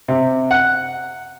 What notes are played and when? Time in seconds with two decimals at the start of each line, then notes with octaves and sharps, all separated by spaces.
0.08 C3
0.51 F#5